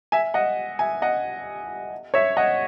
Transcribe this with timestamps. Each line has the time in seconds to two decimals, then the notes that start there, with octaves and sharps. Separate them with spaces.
0.12 E5 G#5
0.34 D#5 F#5
0.79 E5 G#5
1.02 D#5 F#5
2.14 C#5 E5
2.37 D#5 F#5